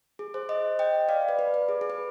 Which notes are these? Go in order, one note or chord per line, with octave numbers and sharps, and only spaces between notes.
G#4
G#4 C5
C5 D#5
D#5 G5
D5 F5
B4 D5
B4
B4
G#4
G#4
B4